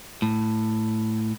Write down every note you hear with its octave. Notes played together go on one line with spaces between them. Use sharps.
A2